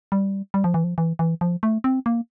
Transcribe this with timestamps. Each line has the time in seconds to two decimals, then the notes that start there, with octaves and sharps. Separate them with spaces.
0.12 G3
0.54 G3
0.64 F3
0.74 E3
0.84 F3
0.98 E3
1.19 E3
1.41 F3
1.63 A3
1.84 C4
2.06 A#3